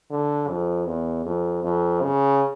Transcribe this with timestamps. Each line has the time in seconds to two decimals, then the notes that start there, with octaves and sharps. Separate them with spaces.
0.10 D3
0.48 F2
0.87 E2
1.25 F2
1.63 F2
2.02 C#3